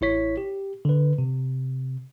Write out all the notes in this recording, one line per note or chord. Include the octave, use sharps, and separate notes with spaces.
A1 E4 C#5 B6
G4
D3 B4
C3